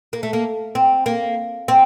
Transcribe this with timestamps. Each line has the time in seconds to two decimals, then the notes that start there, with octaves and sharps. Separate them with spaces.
0.13 A#3
0.23 A3
0.33 A#3
0.75 C4
1.06 A#3
1.68 C4